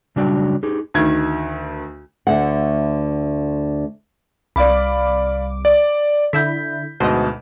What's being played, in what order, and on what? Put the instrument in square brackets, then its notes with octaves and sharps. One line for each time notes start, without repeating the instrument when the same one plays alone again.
[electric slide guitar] C#3 F#3 G3 D4 F#4 G5
D#4 G4 G#4
[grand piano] D2 D#3 G#6
[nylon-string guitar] D2 D3 A3 F#5
[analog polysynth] C2 D6 [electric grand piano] D5 F5 B5
[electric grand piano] D5
[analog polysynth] D3 E4 [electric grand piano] G6 B6
[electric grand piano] D2 G#2 B2 [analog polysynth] C5 D#5